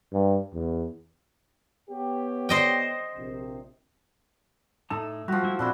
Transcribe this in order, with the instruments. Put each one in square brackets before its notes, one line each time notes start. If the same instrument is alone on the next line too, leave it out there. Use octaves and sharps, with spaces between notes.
[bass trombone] G2
E2
[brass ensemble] B3 G4 C#5
[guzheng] C5 D#5 G5
[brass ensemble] A#1 C3
[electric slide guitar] A2 D#4 A5 [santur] A3
[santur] F3 F#4 [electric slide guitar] G3
[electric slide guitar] G3 A3 E4
[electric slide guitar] A#2 C4 [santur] D4 E4 F#4